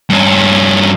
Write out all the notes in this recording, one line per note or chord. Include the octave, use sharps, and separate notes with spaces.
G2 C#4